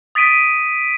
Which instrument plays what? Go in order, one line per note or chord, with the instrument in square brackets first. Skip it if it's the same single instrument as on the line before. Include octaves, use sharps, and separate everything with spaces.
[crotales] D#6 A6 B6 D7 D#7